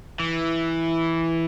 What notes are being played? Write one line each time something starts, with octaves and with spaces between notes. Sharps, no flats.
E3